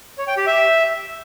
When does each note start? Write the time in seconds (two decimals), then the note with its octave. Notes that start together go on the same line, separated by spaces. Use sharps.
0.18 C#5
0.28 G5
0.37 G4
0.47 E5